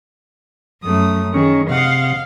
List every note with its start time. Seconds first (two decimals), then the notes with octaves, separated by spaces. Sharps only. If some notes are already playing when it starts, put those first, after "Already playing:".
0.83 F#2 A3 D#6
1.34 D#3 C#4 G#4
1.69 C3 D#5 F5 F#5